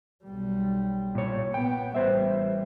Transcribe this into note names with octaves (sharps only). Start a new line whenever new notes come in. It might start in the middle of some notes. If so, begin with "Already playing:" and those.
B1 G3
A#2 C#5
B3 G5
A1 G3 B4 C5 E5